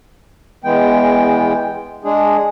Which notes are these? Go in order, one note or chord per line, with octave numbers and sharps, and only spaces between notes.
E2 E3 G#3 B3 G5
G#3 D4 G#4